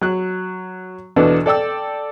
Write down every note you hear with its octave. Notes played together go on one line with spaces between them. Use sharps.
F#3 F#6
E2 B2 E3 D4 A4
A4 D5 G5 E6